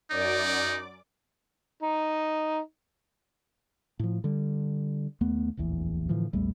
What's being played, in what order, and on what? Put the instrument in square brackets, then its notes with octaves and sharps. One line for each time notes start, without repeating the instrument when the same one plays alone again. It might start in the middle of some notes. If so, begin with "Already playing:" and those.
[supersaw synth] F#2 D5 D6 [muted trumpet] D#4
[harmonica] D#4
[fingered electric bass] A2 F3
D3 G3
D#2 A3 B3
D1 A#1 E2 E3
A2 D3 E3 F3
A#1 E2 G3 A3